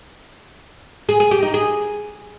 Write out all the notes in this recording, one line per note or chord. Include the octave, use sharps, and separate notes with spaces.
G#4
G#4
G4
D#4
G#4